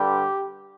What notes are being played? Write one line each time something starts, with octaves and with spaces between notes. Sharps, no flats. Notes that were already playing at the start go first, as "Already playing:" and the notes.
Already playing: G2 D3 G3 G4